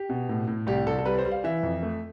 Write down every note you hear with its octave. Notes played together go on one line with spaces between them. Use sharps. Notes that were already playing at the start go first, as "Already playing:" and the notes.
Already playing: G4
B2
A2
A2
C2 G4
C2 A4
A4
G3 B4
C5
G3
F5
E3 E5
F2
A3